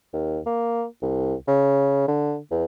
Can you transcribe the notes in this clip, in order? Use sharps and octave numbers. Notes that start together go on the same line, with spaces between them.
D#2
A#3
C2
C#3
D3
E2